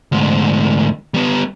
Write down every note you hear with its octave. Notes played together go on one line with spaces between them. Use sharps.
D2 G#2
G3 B3